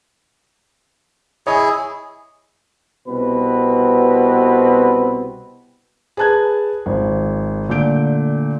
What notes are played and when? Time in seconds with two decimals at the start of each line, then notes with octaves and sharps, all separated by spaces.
1.47 E4 G#4 C#5 D#5 G#5
3.08 C2 B2 C4 B4
6.17 G#4 B4 A5 F#6 G#6
6.86 G#1 F3
7.69 A#2 D3 A3 G6 D7